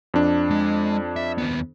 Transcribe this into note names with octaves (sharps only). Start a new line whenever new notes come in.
F2 D4
G#3
E5
D#2 B3